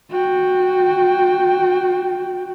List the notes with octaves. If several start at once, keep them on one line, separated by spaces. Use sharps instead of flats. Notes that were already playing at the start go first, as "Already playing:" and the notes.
F#4 G5